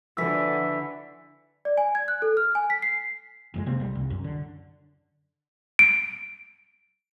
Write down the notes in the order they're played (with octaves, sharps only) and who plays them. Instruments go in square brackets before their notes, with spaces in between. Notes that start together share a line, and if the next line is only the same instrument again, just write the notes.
[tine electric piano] G1 F3 A4 [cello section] D3 [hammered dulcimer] E3 F#4 [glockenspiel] E6 B6
[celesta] D5
G#5
G#6
F#6
A4
F6
G#5
B6
C7
[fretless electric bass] F#1 F2 G#3
C3 A#3 C4
B1 G3
C2
F#2
D3
[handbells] D7